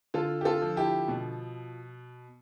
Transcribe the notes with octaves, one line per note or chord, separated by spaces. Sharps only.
D3 F4 A4
G4
F4 A4
F3
E4 G4
B2